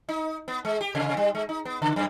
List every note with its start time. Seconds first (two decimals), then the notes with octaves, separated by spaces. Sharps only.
0.09 D#4
0.48 B3
0.65 G#3
0.81 G4
0.95 C3
1.17 G3
1.35 G#3
1.49 D#4
1.65 B3
1.82 C#3
1.96 F#2